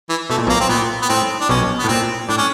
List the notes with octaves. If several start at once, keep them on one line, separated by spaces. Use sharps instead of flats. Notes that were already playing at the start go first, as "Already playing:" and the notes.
E3
B2 A3
A#2
B1 B2 A#3
C4
A#2 B3
B3
A2 C4
D4
B1 B2 C#4
B3
A2
A#2 C4
A2 D4
C#4